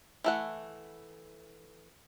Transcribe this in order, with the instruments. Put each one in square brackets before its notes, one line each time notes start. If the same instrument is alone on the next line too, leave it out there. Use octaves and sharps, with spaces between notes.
[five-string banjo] E3 A3 F#5